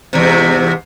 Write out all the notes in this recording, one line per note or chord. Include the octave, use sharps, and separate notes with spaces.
E2 G#2 C3